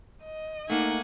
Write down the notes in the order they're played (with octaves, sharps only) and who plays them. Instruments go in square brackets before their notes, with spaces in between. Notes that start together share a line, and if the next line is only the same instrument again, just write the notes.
[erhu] D#5
[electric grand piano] A3 A#3 [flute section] D#4 [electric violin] F#5 G#5